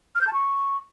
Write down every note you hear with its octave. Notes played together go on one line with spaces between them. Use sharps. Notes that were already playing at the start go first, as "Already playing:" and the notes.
F6
G6
A5
C#6